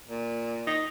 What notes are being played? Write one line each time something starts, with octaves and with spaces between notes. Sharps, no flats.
A#2
D#4